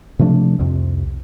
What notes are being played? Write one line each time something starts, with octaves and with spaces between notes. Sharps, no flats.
C3 F3 A3 D4
C2 F2 C3